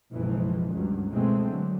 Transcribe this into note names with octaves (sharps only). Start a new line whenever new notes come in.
F#1 B1 B2 E3 F3 G#3
C#2 G2 C#3 F#3
B2 E3 G#3 A3 C4
D3 F#3 G#3